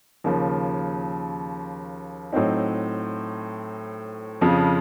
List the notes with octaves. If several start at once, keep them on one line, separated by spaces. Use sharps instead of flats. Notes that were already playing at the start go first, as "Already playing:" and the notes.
D#2 C#3 F3
A2 F#3 C4 D#4
F2 C#3 F3